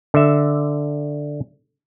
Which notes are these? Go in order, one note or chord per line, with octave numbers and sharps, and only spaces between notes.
D3 E5